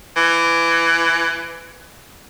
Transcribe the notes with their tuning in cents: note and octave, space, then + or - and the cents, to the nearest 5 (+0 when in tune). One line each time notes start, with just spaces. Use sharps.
E3 +20